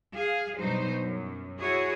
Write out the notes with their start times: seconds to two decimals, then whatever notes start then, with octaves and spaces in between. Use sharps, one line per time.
0.14 G#4 F5
0.56 G2 B2 F#3 D#4 C5
0.99 F#2
1.59 E4 F#4 G#4 C#5